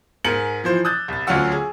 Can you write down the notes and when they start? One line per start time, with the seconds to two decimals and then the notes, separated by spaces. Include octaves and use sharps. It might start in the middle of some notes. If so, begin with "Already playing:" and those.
0.24 G#2 A#4 G#5 C#7 F#7
0.64 E3 F3 C5
0.85 D#6 E6 F#6 G6 A6
1.08 C2 A6
1.27 D2 F#3 C#4 F4 F#5 E6
1.52 G#4